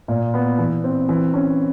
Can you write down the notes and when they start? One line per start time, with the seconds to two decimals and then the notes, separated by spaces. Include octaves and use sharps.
0.08 A#2
0.34 B3
0.58 E3
0.84 C4
1.09 E3
1.34 C#4